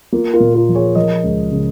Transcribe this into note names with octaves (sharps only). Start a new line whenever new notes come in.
A#3 F4
F4 A#4
A#2
F4 A#4
F3
G#4 C#5
F3 A#4 D#5
C#2
C#3